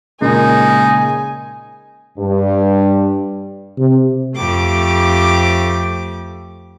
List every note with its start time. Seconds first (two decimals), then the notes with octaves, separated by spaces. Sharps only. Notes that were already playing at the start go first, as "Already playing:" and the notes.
0.22 A#2 C#3 G#3 D#4 G#5
2.18 G2
3.79 C3
4.36 F2 A3 G4 D6